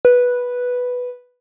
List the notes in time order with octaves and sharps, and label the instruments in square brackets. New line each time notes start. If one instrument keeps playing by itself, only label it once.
[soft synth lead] B4